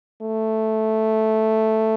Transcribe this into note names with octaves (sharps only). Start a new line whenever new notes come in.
A3